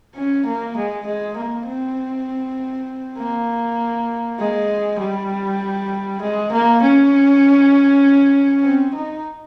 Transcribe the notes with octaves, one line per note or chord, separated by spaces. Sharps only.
C#4
A#3
G#3
G#3
A#3
C4
A#3
G#3
G3
G#3
A#3
C#4
C4
D#4